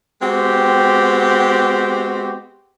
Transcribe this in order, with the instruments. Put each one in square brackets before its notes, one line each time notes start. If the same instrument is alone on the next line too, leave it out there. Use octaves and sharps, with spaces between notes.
[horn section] G#3 B3 C4 F#4 G4